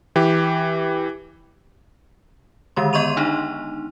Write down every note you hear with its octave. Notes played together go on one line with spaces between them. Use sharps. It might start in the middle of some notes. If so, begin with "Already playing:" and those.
E3 G4
D3 D#3 G#3 C6
B3 D#5 C6 C#6 D#7 F7
D4 D#4